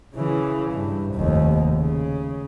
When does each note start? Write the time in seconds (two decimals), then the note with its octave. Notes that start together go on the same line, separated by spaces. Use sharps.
0.15 C#3 E3
0.72 G2
1.15 F1 D#2
1.76 C#3